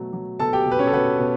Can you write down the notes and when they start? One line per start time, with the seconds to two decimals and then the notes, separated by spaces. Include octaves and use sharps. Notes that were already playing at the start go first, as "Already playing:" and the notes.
Already playing: B2 F#3 A3
0.13 F#3
0.40 B2 A4 A5
0.53 G4 G5
0.66 B2
0.72 B4
0.79 C#4 C#5
0.87 A4
0.93 B2 B3 B4
1.19 B2